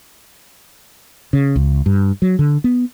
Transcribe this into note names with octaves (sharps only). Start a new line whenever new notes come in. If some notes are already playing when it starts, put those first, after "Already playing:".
C#3
C#2
G2
F#3
D3
B3